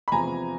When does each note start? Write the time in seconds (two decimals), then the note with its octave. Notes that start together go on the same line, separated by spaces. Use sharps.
0.08 B5
0.12 E2 C3 F3 G#5 A#5